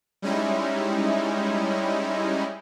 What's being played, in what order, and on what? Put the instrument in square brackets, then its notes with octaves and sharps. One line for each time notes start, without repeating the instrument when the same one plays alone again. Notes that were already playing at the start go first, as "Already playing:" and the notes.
[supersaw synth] G3 G#3 C#4 D#4 E4